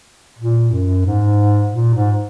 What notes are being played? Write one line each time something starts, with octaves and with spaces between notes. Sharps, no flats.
A#2
F#2
G#2
A#2
G#2